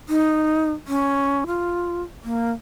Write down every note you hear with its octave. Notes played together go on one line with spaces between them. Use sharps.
D#4
C#4
F4
A#3